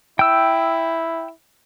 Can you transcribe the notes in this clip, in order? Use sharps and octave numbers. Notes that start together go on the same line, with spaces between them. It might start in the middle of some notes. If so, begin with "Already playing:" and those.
E4 G5 E6